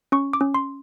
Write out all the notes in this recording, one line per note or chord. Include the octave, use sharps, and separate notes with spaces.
C#4 C#6
D6
C#4
C6